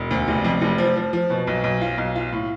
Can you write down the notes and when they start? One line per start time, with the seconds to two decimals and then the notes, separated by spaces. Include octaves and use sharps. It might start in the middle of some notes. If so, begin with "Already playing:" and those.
Already playing: E1
0.11 D2
0.28 F1
0.45 F2
0.62 F1
0.78 F3
0.96 F3
1.13 F3
1.30 B2
1.47 B1
1.64 B1
1.81 F4
1.98 B1
2.16 F4
2.33 A2